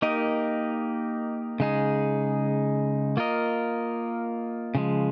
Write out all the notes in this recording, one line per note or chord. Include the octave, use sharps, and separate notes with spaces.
A#3 D#4 G4 A#4 D#5
C#3 G#3 D#4 G#4
A#3 F4 A#4 D#5
C#3 F3 G#3